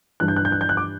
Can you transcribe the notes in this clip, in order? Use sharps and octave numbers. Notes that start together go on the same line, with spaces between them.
G2 E3 G3 D4 F#6
G6
F#6
G6
F#6
G6
F#6
D6